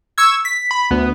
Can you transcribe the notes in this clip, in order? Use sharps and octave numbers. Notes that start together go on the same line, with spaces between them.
C#6 E6 G#6
B6
B5
D2 B3